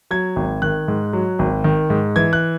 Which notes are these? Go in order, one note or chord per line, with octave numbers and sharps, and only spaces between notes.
F#3 G#6
G#1
D#3 F#6
G#2
F#3
G#1
D#3
G#2
E3 G#6
F#6